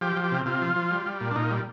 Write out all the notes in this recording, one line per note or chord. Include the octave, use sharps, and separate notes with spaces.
F3 G4
F3
G4
C3
C3 F4
F3
F3
G3
G3
A#2
D4
A#2 D#4
G3